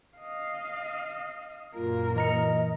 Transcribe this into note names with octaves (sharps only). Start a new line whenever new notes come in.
D#5 F5
F#2 A#2 A#3 F4 A#4
E3 D#5 A#5 C#7